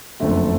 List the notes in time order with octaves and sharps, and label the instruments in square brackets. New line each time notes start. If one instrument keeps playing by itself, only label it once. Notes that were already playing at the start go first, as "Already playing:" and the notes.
[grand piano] F#1 F2 D3 A3